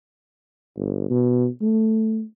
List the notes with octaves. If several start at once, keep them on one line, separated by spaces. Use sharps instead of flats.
G1
B2
A3